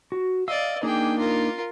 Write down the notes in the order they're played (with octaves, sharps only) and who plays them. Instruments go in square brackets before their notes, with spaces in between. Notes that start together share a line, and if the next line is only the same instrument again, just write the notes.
[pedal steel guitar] F#4
[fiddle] D5 D#5 [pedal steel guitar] F5 E6
[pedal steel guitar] A#3 D4 D#4 [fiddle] G#4 G5
[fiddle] F4 A#4